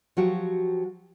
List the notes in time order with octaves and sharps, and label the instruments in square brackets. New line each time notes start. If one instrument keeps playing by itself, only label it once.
[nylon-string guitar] F3 F#3 F#4 G4